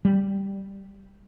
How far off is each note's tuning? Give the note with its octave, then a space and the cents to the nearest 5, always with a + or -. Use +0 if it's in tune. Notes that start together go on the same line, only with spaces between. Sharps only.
G3 -5